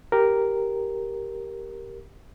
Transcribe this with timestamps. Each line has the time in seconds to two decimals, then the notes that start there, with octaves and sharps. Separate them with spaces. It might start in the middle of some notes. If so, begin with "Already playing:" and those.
0.12 G4 A#4